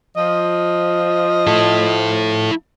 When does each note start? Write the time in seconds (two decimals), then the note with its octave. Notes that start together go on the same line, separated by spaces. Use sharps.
0.17 F3 D#5
1.47 E4 A4